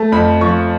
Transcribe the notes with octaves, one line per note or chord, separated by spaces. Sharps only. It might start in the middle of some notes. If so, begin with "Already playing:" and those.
Already playing: A3 A5
F2 B5
F3 C#6